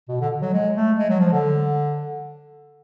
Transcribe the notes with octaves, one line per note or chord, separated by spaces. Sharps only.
B2
D3
F#3
G#3
A3
G#3
F#3
F3
D3